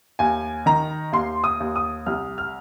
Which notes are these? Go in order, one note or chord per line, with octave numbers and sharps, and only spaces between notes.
D#2 G#5
D#3 A#5
D#2 C6
D#6
D#2
D#6
C2 F6
F6